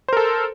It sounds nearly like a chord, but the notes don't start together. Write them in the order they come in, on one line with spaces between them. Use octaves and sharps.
C5 A#4 A4